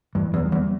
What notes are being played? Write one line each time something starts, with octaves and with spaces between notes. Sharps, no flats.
G2 E3
E2
G3 A#3
E2